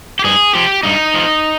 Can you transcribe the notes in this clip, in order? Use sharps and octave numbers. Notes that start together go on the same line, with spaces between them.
G4
G2 G#4
F3 G4
G2 D#4
F3